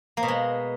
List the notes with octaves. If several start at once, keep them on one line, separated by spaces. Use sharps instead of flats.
A#3
B2
G#3